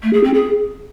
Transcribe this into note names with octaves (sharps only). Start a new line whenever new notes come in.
A3
G#4
C4
G#4